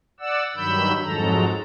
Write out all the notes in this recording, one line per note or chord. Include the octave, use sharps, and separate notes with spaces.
D5 F#5 E6
G2 D#3 F#3 B5 E6 G6
F2 G#2 F#3 G#3 A4 A#5